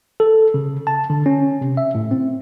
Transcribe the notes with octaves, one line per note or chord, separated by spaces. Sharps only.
A4
C#3
A5
D3
C#4
C3
E5
A2
C4